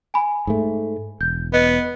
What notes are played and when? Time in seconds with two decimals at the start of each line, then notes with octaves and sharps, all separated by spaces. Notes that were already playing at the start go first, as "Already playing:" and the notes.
0.14 G#5 B5
0.47 G#2 A3
1.21 E1 G6
1.53 B3 D#5